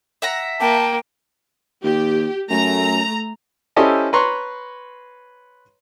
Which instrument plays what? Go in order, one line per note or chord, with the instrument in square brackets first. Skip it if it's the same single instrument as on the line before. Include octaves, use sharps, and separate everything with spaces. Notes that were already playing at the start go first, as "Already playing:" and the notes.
[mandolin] E5 F#5 A#5
[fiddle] A#3 [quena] G5 [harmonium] A5
[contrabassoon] D#2 [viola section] G4
[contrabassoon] F#2 [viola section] A3 A#5
[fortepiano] C#4 E4 G4 A4 C5 D#5
B4 C#5 A#5 C6 C#6